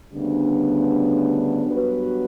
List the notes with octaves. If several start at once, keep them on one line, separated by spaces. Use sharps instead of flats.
D2 C#3 G3 B3 D4
G2 F#3 B3 F#4 B4